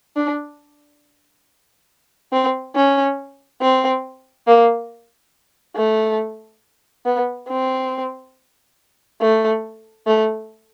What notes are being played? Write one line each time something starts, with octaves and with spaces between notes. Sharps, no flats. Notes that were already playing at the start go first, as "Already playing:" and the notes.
D4
C4
C#4
C4
A#3
A3
B3
C4
A3
A3